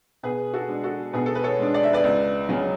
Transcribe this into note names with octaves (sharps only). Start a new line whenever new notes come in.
B2 G#4 B4
F#4 A4
G#3 D4
F#4 A4
B2 G#4 B4
A4
B4
A4 C#5
G#3 D4
D5
E5
B4 D5
C#2
C#3 F#3 C#4